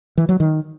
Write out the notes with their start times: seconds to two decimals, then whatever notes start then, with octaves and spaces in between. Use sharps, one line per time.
0.18 E3
0.29 F#3
0.40 D#3